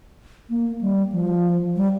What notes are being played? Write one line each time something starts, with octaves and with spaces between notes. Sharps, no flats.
A#3
G3
F3
G3